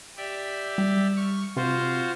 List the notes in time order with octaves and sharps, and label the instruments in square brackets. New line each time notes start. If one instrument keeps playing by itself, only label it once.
[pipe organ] G4 D5 E5
[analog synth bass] G3
[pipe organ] C#6 F6
[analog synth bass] C3 [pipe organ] F4 F#4 C5